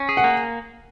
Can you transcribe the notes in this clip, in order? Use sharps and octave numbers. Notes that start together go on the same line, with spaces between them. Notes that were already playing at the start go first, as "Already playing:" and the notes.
Already playing: C#4
G#4
F#5
A#3